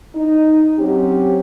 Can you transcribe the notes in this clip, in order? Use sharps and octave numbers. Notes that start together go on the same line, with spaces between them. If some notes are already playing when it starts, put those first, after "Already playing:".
D#4
F#3 C4 C#4 G4